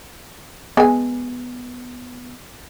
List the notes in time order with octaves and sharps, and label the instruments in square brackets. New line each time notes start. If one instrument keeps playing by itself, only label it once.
[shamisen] G#3 G#5 [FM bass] B3